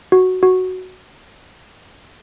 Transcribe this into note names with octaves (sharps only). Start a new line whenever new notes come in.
F#4
F#4